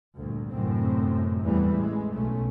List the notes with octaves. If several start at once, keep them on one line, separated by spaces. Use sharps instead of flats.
D2 G2 A#2
G1 F#2 A2 C3 C4
E2 A2 E3 G3 A3
A1 G#3
B1 B2 A3 C#4